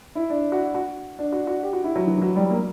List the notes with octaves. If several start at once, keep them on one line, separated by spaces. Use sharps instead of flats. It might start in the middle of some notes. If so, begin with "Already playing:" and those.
E4
D4
F#4
F#4
D4
F#4
F#4
G4
F#4
E4
F#3
E3
E3
F#3
G3
A#3